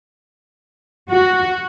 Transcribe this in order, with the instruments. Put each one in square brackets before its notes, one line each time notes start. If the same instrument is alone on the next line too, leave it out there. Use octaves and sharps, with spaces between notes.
[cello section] F#4